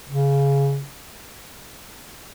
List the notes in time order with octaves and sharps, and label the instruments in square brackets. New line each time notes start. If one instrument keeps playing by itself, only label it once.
[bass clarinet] C#3